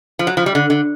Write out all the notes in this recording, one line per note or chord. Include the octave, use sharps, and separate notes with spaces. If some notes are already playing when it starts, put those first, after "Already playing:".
F3
F#3
F3
G3
D3
D3